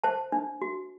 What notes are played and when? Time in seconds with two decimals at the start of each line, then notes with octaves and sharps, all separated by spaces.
0.04 C5 A5
0.32 D4
0.62 F#4